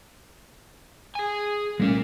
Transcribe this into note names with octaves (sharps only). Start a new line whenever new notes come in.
G#4 G#5
A#2 G3 A3 A#3 C#4